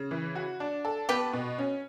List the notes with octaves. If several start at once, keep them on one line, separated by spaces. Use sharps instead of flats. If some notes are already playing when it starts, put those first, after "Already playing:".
Already playing: C#3
E3
F#4
D4
A4
B3 G4 B4
B2
C#4